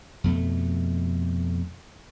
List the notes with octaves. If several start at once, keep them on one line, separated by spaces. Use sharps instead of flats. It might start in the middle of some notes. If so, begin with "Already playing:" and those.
F2 B2 A3